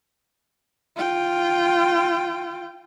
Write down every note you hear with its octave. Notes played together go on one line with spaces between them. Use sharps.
F4 G5